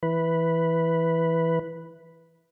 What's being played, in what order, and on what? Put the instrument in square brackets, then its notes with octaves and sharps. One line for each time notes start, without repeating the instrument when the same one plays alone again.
[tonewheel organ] E3 B4